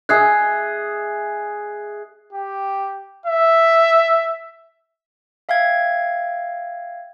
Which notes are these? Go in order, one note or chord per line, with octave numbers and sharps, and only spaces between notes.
G#4 D#5 E5 F#6 G#6 C7
G4
E5
E5 F5 G5 G#6